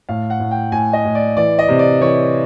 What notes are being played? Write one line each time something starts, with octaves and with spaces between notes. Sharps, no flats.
A2 F5
F#5
A2
G5
A2 G#5
D#5
A2
D5
E3 D5
D#5
C3
D5
E3 C#5